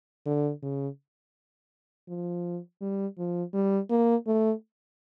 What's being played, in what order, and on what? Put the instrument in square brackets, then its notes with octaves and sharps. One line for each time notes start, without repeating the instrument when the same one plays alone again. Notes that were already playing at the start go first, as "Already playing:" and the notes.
[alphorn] D3
C#3
F3
G3
F3
G3
A#3
A3